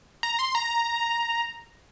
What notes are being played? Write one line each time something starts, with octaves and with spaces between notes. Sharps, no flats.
A#5
C6
A#5